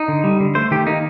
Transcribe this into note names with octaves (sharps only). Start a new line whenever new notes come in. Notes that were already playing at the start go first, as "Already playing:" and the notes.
Already playing: D#4
D3
G3
D3
A3 C5
D#3 G4
A#3 D#4